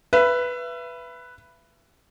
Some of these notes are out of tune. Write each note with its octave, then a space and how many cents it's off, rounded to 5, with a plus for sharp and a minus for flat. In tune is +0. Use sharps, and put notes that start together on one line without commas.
B4 +0 E5 +30